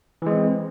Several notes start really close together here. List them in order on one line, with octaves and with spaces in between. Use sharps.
E3 G#3 C4